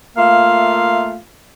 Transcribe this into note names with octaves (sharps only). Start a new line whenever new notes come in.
A3 A#3 F4 E5 F5